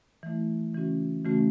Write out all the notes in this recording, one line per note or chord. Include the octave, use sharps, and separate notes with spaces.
E3 A3 E4
C#3 E3 A3 C#4 F#4
C#3 E3 A3 C#4 F#4